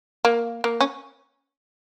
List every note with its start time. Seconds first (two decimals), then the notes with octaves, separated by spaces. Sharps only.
0.25 A#3
0.64 A#3
0.81 C#4